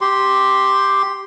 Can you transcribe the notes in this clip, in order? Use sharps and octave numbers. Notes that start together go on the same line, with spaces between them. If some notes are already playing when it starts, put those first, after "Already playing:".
G4 C6